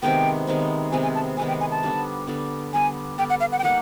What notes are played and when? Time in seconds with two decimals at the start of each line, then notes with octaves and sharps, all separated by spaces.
0.02 C3 D#3 G#3 B3 G5
0.47 C3 D#3 G#3 B3
0.92 C3 D#3 G#3 B3 G#5
1.03 G#5
1.15 A5
1.37 C3 D#3 G#3 B3 G#5
1.48 G5
1.60 G#5
1.71 A5
1.83 D3 G3 B3 D4
2.27 D3 G3 B3 D4
2.73 D3 G3 B3 D4 G#5
3.18 D3 G3 B3 D4 G5
3.30 F#5
3.40 F5
3.52 F#5
3.59 G5
3.63 G3 A#3 D#4 G4 F#5